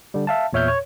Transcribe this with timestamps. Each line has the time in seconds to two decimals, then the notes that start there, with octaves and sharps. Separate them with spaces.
0.14 D3 G3
0.27 E5 F5 A5
0.53 E2 A#2 C#5 E5 F6 G6
0.68 C#5